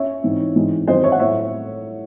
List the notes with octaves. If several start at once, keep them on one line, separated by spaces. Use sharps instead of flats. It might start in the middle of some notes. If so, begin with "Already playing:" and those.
Already playing: C#4 C#5 E5
G#2 E3 C4 D#4
G#2 E3 G#3 C4 D#4
F#2 D#3 F#3 C4 C5 D#5
C#5 E5
F#5
A2 C#5 E5